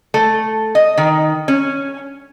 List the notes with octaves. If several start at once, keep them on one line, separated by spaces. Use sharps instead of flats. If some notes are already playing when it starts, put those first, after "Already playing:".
A3
D#5
D#3
C#4